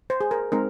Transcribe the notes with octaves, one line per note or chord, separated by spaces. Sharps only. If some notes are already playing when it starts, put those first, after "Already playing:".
C5
G#4
A#4
G#3 C4 D#4 A#4